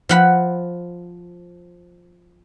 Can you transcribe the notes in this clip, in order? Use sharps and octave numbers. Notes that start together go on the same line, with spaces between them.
F3 F#5 B5